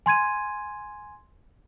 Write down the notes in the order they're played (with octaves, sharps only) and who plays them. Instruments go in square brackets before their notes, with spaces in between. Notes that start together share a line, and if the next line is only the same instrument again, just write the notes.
[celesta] G#5 C6 G#6 D#7